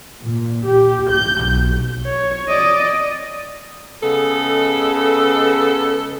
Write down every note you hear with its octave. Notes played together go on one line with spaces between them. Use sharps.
A#2
G4
G6
B1
C#5
D5 D#5
C#3 G#3 B3 A4